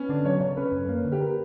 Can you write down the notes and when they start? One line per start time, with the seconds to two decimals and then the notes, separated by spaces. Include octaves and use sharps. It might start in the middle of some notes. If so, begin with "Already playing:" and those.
Already playing: B3 C#4
0.09 D3 D4
0.25 F#3 C#5
0.40 C#3 C#5
0.57 C#4 B4
0.72 F#2
0.89 A#3
1.05 D3
1.12 G4
1.20 A#4